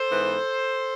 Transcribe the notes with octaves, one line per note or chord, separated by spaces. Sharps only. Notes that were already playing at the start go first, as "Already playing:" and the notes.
Already playing: A4 C5
G#2 E3 B3